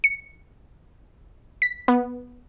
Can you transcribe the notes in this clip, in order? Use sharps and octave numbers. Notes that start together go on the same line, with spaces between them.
C#7
B6
B3